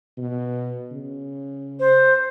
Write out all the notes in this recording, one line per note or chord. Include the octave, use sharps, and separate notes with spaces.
B2
C#3
C5